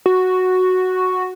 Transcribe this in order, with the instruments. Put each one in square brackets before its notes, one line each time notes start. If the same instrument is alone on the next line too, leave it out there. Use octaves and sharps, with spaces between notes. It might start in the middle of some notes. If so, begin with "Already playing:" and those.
[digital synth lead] F#4